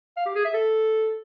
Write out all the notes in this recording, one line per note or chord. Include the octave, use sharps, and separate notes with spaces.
F5
G4
G#4
E5
A4